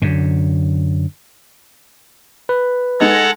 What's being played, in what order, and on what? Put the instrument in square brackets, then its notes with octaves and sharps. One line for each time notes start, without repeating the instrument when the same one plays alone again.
[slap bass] F#2 D3
[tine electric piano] B4
[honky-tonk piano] G#3 D#4 G#6 [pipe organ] A4 F#5 A#5